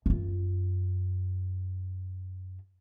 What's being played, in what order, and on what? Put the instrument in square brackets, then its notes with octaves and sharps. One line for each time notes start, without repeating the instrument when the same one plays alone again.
[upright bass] F#2 F4